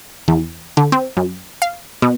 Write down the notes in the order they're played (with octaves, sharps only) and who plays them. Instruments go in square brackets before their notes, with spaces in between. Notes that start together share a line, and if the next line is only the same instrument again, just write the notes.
[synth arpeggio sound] E2
D3
C4
F#2
F5
B2